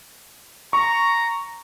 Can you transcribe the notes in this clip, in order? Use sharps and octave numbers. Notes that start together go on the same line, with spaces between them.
A#5 C#6